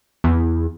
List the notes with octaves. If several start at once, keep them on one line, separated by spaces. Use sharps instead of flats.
E2